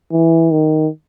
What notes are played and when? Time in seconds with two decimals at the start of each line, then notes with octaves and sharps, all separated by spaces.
0.12 E3
0.51 D#3